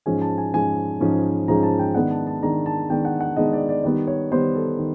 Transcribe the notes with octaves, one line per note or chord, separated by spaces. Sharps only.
G#2 F3 G#3 C#4 G#5
A5
G#5
G#2 F3 G#3 C#4 G#5
G#2 F3 G#3 C#4
G#2 F3 G#3 C#4 A#5
A5
G5
D#3 G#3 B3 D4 F#5
A5
A5
D#3 G#3 B3 D4 A#5
A5
D#3 G#3 B3 D4 G5
F#5
F#5
D#3 G#3 B3 D4 D#5
D5
D5
D#3 G3 B3 D5
C#5
D#3 G3 B3 C5
A4
D#3